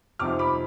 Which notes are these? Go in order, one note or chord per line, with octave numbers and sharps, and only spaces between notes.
F2 C3 F3 C4 D#4 D6 F6
B5 D6